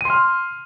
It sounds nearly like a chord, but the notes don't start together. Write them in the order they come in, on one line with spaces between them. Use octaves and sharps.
D#7 C6 F6